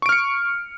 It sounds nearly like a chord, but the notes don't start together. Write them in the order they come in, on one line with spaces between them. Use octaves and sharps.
C#6 D7 F6 C#7